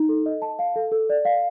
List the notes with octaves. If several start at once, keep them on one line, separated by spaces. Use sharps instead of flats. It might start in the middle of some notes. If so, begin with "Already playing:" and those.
Already playing: D#4
A4
D#5
A5
F5
A4
A4
D5
F5